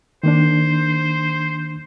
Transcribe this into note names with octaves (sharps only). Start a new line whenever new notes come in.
D#3 A#3 D4 C5